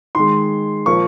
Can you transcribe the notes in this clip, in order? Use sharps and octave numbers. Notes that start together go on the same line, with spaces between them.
D#3 G#3 C6
A#2 F3 A#3 C#6